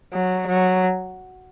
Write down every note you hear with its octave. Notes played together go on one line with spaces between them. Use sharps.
F#3
F#3